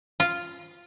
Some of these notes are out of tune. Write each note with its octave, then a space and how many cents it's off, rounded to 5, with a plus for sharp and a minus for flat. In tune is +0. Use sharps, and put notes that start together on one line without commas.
F4 -5